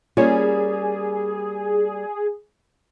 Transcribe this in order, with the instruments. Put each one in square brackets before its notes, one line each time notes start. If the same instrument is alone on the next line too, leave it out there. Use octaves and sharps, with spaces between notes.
[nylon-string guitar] G3 A#3 C#4 [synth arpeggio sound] F4 C#5 [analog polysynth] G#4